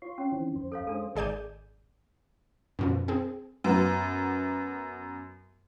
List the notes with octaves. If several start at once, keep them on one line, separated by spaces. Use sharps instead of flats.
F4 C#5 C6
C#4
D#3 E3 C4
F2 C5
A4 C#5 F5
G#3 D4 A4 C5 D#6
G#1 G#4 D5 G6 D#7
F#2 B2 F3
C4 G#4
F#2 B3